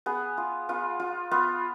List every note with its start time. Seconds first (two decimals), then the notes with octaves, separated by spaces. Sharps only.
0.06 B3 G#4
0.37 F4
0.69 B3 F4
1.00 F4
1.31 B3 F4